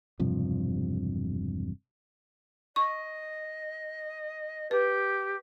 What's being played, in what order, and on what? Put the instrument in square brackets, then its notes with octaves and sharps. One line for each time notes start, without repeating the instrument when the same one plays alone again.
[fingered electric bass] E1 G2 C3 F3
[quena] D#5 [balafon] C#6
[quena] G4 [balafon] B4